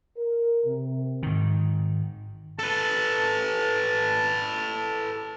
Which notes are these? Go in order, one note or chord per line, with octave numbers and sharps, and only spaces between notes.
A#4
C3
G#2 D#3
A4 B4 A5